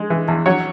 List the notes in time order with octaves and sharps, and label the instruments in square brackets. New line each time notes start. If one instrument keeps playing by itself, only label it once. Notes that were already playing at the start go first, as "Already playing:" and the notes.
Already playing: [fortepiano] G#3
E3
E2
F#3 C#5